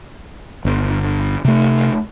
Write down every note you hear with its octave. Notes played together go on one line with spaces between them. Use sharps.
G1
C3 A3